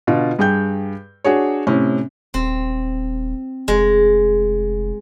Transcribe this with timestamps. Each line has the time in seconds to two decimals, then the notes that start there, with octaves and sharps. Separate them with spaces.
0.07 B2 D3 F4
0.39 G2 G#4 G5 G6
1.25 D4 F#4 G#4 C#5
1.67 A2 C3 C#4
2.34 D#1 C4
3.68 F1 G#3